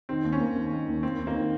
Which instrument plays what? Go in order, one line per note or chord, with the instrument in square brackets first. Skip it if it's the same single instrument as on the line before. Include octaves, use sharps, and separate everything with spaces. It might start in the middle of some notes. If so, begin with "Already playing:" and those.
[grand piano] D#3 [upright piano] C4
[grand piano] D#2
[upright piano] C#4
[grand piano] A#3
D#2
D#3
D#2
[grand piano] A#3 [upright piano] C4
[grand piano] D#2
[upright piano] A#3
[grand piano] D#3